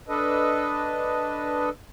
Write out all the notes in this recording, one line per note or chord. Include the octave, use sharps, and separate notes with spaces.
D4 A4 B4 D#5